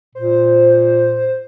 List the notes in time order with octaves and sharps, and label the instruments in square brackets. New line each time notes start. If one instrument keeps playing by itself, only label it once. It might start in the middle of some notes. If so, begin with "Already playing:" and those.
[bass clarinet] A#2 [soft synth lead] C5